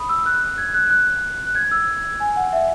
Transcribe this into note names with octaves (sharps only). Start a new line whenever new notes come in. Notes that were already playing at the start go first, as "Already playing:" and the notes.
Already playing: B5 D#6
E6
F#6
G#6
F#6
F#6
F#6
G#6
E6
G#5
F#5
E5